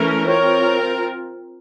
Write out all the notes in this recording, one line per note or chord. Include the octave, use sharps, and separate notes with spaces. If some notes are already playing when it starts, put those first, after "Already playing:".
Already playing: E3 A3 C#4 A#4
C4 F4 A#4 C#5